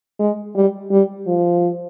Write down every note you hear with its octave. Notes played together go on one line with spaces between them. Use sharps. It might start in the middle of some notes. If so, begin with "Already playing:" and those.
G#3
G3
G3
F3